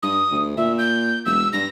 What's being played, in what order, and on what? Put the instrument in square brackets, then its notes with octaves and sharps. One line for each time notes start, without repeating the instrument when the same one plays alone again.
[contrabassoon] G2 [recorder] D#6
[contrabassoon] D2
[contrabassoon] A#2 [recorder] E5
[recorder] G6
[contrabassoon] E1 [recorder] E6
[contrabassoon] G2 [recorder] A#6